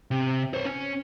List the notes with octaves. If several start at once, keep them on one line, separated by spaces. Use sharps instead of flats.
C3
C5 C#5
C#4